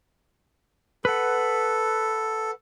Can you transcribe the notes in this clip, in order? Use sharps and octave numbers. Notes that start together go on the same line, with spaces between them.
A4 B4 F#5